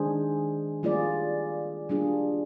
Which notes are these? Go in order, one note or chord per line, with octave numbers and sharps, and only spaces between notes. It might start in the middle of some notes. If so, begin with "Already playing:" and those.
Already playing: D#3 G#3 D4 G#4 C5
G3 A#3 F4 G#4 D5
G3 A#3 D4 F4 G#4